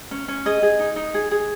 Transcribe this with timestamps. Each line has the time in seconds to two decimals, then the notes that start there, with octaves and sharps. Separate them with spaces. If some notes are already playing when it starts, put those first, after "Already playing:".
0.11 C#4
0.28 C#4
0.46 G#4 D#5
0.62 G#4
0.79 D#4
0.96 D#4
1.14 G#4
1.31 G#4